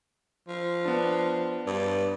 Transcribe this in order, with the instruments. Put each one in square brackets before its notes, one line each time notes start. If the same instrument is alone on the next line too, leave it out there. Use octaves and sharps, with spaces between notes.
[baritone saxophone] F3
[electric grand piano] B3 D4
[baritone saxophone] G2